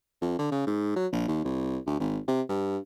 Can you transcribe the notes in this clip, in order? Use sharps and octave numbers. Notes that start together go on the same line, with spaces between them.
F2
D3
C#3
G#2
F#3
A#1
D#2
C2
D2
G#1
C3
G2